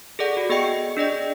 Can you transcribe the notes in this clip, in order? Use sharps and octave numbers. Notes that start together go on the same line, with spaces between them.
G#4 A4 D5 F#5
F#4
B3 G#4 D#5 G5 C#7
D4 G#4 D5 D#5